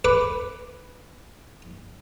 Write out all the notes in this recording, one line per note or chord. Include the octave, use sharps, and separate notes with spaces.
B4 D6